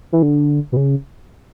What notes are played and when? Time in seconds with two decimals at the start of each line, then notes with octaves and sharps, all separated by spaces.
0.12 E3
0.22 D3
0.72 B2
0.77 C#3